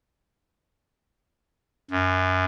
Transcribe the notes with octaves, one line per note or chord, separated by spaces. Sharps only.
F#2